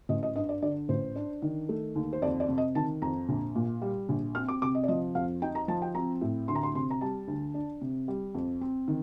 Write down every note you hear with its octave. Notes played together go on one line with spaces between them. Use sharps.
A1 D#5
D#5
G2 D#5
D5
D3 D5
A1 C5
D4
D#3
A3
D#2
C5
F2 D5
D5
C3
D#5
D#3 A5
F2 A#5
A#1
A#2
G3
A#1
C4 F6
D6
C3 D6
D#5
D5
F3 D#5
F2 F5
D#4 G5
A#5
F3 A5
G5
C4 A#5
A2
D2 C6
A#5
C6
C3 C6
A#5
G3 A5
D2
D4
C3
G3
F2
C4
D#3